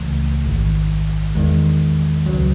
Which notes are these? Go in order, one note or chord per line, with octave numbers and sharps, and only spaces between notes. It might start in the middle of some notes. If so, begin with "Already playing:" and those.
Already playing: C#2 C#3 E3 A3
A1 G#2 D#3
E2 D#3 G#3
C#2 C#3 F#3